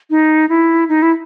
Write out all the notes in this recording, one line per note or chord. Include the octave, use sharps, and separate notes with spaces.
D#4
E4
D#4
E4